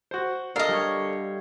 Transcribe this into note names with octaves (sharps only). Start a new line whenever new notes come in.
F#4 C5
D3 A4 A#4 D#5 F5
G3 C#5